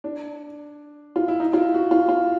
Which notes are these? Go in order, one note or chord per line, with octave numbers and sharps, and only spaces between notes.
D4
F4
E4
D#4
F4
E4
F#4
F4
F4